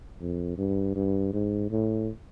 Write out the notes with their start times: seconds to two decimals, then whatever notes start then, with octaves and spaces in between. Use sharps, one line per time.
0.21 F2
0.58 G2
0.95 G2
1.33 G#2
1.71 A2